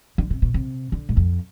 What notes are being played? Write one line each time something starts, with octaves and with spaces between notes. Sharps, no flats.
D3
C3
B2
C3
D3
G#2
F2